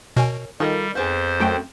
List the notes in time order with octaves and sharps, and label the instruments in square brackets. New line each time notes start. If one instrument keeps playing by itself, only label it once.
[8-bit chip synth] B2 [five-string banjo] A#4 C#5 G#5
[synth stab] D#3 [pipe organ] G3 [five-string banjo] F4 A4 A#4
[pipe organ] F2 C5 [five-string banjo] B3 C4 G#4
[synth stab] F#2 A3 G5